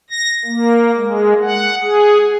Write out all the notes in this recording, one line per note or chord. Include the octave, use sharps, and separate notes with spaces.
A#6
A#3
G#3
F#5
G#4